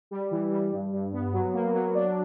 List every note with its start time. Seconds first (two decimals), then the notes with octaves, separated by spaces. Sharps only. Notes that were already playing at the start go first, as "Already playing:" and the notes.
0.11 G3
0.31 E3
0.51 G3
0.72 G2
0.93 G2
1.13 B3
1.33 F#3
1.53 A#3
1.74 F#3
1.94 D4